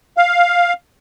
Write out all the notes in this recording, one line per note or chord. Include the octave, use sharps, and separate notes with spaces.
F5